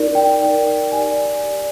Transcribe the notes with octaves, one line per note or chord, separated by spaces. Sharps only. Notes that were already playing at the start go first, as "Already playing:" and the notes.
Already playing: D#4 A#4 D5
G5
D#4 A#4 D5
G4 D5 G#5
G4 D5